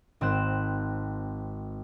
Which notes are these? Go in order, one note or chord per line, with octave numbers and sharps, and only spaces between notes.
G#1 C4 F#6 E7